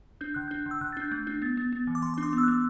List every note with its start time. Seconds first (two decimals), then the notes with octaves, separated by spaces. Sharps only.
0.21 D4 G6
0.34 D3 F#6
0.48 D4 G6
0.66 D3
0.71 E6
0.81 D3 F#6
0.92 A6
0.97 D4 G6
1.11 A3
1.27 D4
1.42 B3 A6
1.57 B3
1.72 B3
1.87 E3
1.95 D6
2.02 E3 C6
2.14 D4 C6
2.23 D6
2.33 B3
2.38 E6
2.43 B3 F#6